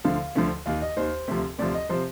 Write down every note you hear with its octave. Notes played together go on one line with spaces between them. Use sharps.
D2 D3 F3 F5
D2 D3 F3
D#2 D#3 F5
D#5
D#2 D#3 C5
D2 C3 F3
D2 C3 F3 D5
D#5
C3 F3 C5